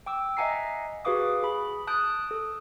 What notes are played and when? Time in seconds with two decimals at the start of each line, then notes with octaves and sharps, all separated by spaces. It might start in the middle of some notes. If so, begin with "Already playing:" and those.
0.06 G5 D6 E6
0.37 D#5 E5 F#5 G#5 A#5 C7
1.05 F#4 G#4 B4 F5 D6 D#6
1.43 G#4 B5
1.87 A5 D#6 F#6 G6 D7
2.29 A4 D#6